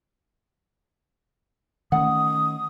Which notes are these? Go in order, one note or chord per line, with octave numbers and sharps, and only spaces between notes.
D#3 A3 C#4 F#5 D#6